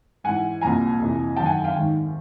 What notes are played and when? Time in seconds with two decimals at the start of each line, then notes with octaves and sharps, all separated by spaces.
0.24 G#2 E3 F#5 G#5
0.61 C2 A#2 F3 G#5 A#5
0.99 F2 C3 E3
1.36 F#2 D#3 G5 A5
1.45 F#5 G#5
1.64 F5 G5
1.73 G#2 D#3